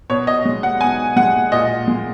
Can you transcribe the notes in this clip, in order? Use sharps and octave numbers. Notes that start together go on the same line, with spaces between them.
B2 C#5
D#5
G#3
F#5
B2 G#5
G#3 F#5
A#2 D#5
G#3